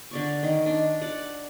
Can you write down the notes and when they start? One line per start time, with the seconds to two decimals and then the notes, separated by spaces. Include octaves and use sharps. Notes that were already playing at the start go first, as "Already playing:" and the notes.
0.11 D3 D5 C#6
0.43 D#3
0.66 D4
1.01 D5 F#5